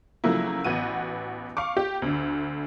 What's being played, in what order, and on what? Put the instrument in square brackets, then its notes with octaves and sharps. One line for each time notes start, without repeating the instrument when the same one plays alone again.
[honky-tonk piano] C#3 F3 F#3 A3 A#3 E4
A1 B3 F#4 D#7
F5 C#6 D6
G4
D2 D3